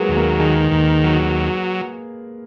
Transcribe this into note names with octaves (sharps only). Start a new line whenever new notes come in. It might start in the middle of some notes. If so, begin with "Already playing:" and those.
Already playing: F#3 G#3 A#3 B3 G#4 A#4 B4
D#2
A#3 A#4
D#3 G#3 G#4
D#2
F#3